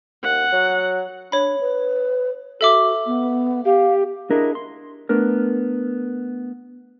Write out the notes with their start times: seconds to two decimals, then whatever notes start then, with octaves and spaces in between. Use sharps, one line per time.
0.24 D#2 F#5
0.52 F#3
1.32 D4 C#5 B5
1.60 B4
2.61 F#4 A4 E5 D6
3.06 B3
3.65 G4 F5
4.30 D4 E4 G#4 A#4 D#5 E5
4.55 C6
5.09 A3 B3 D4 A#4